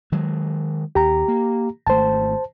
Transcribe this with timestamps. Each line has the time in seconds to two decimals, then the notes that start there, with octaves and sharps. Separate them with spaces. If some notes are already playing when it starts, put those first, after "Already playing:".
0.12 D#3 F#3 G#3
0.95 D#2 G4 A#5
1.28 A#3
1.87 G#1 A3 C5 A5